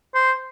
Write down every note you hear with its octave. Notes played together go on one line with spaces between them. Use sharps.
C5